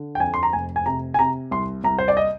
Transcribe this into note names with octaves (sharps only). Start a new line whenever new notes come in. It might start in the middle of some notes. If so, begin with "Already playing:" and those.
Already playing: D3
G5
F2 G#5
C6
A#5
F1 G#5
G#5
C3 A#5
G#5
C3 A#5
C2 C6
C2 A#5
C5
D5
D#5